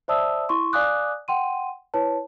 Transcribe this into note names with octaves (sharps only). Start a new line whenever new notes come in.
C5 D5 E5 A5 D#6 E6
E4 C6 C#6
D5 F5 G#5 D6 D#6 F#6
F#5 G5 C6 D#7
E4 B4 C#5 A5